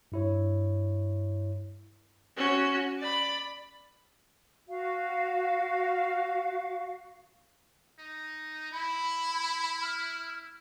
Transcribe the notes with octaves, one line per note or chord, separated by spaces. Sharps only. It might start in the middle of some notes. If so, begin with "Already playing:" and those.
G2 E4 C#5
C#4 F#4
D5 B5
F#4 F5
D#4
E4 B5
F6